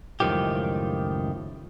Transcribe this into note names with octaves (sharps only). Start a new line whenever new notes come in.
C#2 F#2 A2 D#3 F3 G4